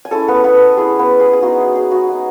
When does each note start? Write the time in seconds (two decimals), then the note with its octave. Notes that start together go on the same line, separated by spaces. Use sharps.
0.05 G#5
0.11 G#3 C#4 E4 A4 A5
0.28 B3 B4
0.44 B3 B4
0.77 G#3 C#4 E4 G#4
0.99 B3 B4
1.20 G#4
1.33 G#4
1.42 G#3 B3 D#4 F#4
1.75 G#4
1.91 F#4
2.08 G#3 B3 D#4